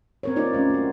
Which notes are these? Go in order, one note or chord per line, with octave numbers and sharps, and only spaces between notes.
C4 A#4 C#5
A#3 D#4 F4 D5
A3 C#4 F4
A#3 F#4